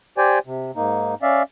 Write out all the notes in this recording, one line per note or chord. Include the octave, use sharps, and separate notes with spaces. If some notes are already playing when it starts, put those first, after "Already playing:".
G4 C5 D5 G5 G#5
C3
G#2 A#3 D#4
C#4 D5 E5 F5